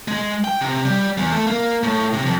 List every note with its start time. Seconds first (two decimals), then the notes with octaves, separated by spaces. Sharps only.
0.08 G#3
0.44 G5
0.61 C3
0.85 G3
1.18 E2
1.32 A3
1.47 A#3
1.83 A2
2.13 C3
2.25 F2